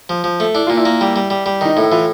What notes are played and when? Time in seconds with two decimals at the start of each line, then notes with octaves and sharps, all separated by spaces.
0.09 F3
0.24 F3
0.40 A3
0.54 D4 E4
0.67 A#2 F4
0.77 E4
0.85 A#3
1.01 G3
1.16 G3
1.30 G3
1.46 G3
1.61 D#3 D#4
1.76 A2 E4
1.91 E3 F4